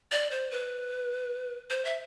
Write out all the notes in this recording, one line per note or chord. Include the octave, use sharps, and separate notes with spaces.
D5
C5
B4
C5
E5